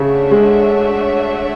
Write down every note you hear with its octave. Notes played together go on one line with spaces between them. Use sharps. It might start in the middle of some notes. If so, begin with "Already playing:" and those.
Already playing: C#3 A3 D4 F#4 C#5 E5
G#3